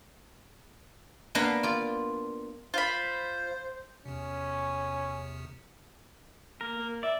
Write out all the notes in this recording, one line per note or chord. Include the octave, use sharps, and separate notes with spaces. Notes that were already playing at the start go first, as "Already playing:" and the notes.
A#3 B3 D4 B4 F5 A#5
F4 D5
F4 C5 B5
E2 C3 C#4
A#3 A#4
A#3
D5 E5